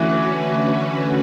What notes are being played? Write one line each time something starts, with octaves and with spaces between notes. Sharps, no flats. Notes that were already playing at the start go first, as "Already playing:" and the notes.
Already playing: D3 E3 A3 C#4 F#4 B4